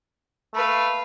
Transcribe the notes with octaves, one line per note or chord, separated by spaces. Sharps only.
A3 B4 F5